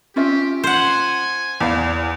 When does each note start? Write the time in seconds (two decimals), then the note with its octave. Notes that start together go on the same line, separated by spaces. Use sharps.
0.16 C#4 F4 G4 E5
0.64 C5 F#5 G#5
1.60 E2 E4 D5 F5